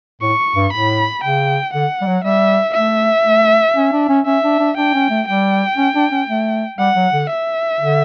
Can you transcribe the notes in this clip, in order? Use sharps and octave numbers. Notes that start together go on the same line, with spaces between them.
A2 C#6
G2
A2 B5
C#3 G5
D3 F#5
G3
F#3
G3 E5
A3 E5
A3
C#4
D4
C#4
C#4 E5
D4
D4
D4 G5
C#4
A3
G3 G5
C#4
D4
C#4
A3
G3 F#5
F#3
D3
E5
D3